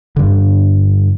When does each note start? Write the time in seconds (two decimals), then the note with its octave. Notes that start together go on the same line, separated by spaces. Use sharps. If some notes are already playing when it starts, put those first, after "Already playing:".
0.16 G2 D3